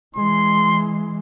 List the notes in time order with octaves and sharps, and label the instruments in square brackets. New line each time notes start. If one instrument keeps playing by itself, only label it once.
[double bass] E3 G#3 [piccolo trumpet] C6